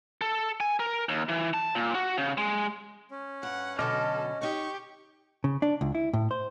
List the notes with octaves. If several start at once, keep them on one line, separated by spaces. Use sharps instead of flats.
A4
G#5
A#4
D#2
E3
A5
A#2
F#4
C#3
G#3
C#4
G2 F#5
B2 D3 F#3 A4 D#5 D6 F6
D#4 G4 C#5 C#6
C#3
D4
C#2
E4
A2
C5